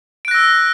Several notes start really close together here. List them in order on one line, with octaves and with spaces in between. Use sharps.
D7 F#6 A#6 E6